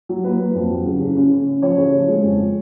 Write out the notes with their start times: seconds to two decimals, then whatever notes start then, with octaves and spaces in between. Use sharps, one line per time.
0.09 F#3
0.24 A#3 B4
0.39 A#3
0.55 F2
0.70 F#3
0.85 C#3
1.01 C#3
1.16 C#4
1.31 C#4
1.47 C#4
1.62 F3 C#5
1.78 C#3
1.93 F3
2.08 G#3
2.23 F2